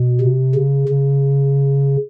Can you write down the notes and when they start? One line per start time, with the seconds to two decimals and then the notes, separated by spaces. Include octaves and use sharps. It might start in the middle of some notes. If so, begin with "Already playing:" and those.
Already playing: B2
0.20 C3
0.55 C#3
0.89 C#3